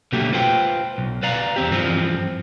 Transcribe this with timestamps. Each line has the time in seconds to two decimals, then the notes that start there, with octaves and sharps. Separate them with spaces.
0.12 B2 D3 F#3 A3 A#3 G4
0.33 F4 B4 C5 G5
0.98 B1
1.23 B4 D5 F5 A#5
1.56 E2 C4 G4
1.71 G2 E3 F3 C4